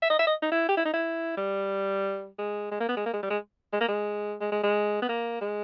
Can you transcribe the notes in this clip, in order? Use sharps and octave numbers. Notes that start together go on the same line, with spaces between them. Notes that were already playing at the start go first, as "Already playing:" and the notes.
E5
D#5
E5
D#5
D#4
E4
G4
E4
D#4
E4
G3
G#3
G#3
A#3
B3
G#3
A#3
G#3
G3
G#3
G#3
A#3
G#3
G#3
G#3
G#3
B3
A#3
G#3